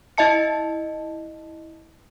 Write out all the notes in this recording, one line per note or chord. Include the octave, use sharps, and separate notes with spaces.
E4 D#5 E5 A5 C#7